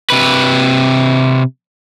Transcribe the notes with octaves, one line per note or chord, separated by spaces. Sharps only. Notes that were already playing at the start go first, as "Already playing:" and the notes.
C3 B4